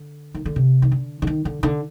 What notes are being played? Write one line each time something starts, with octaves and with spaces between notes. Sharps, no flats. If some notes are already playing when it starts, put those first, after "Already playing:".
Already playing: D3
D#3
D3
C3
D#3
D3
D3
D#3
D3
D3